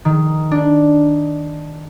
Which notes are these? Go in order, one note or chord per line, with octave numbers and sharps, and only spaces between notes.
D#3
D4